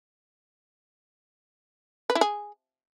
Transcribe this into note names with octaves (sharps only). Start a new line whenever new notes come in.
B4
E4
G#4